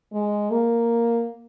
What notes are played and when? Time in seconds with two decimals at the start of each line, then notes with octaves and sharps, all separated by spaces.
0.12 G#3
0.50 A#3